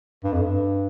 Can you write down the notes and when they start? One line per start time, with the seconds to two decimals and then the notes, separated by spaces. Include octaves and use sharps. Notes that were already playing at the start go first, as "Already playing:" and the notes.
0.24 G2
0.32 F2
0.41 G2